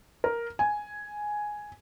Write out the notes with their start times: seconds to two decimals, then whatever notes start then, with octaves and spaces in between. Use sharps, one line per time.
0.24 A#4
0.59 G#5